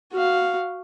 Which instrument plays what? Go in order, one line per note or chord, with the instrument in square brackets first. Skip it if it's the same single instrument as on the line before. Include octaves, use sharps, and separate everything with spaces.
[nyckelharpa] F#4 F5